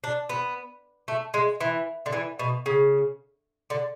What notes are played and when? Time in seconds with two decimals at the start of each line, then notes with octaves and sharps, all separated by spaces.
0.04 D4
0.29 B3
1.08 A3
1.34 G#3
1.61 E3
2.06 D3
2.13 E3
2.39 B2
2.66 C#3
3.70 D3